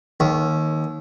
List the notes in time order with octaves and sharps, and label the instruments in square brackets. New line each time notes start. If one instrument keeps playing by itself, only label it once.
[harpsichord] D#2